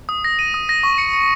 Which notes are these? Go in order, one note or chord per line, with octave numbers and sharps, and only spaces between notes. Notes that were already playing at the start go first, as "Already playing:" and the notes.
D#6
A#6
D#7
D#6
A#6
C#6
C#7
C#7